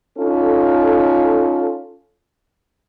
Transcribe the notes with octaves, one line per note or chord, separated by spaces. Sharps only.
C#4 D#4 F4 A4